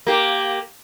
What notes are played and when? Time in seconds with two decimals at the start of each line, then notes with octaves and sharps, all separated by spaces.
0.07 A#3 G4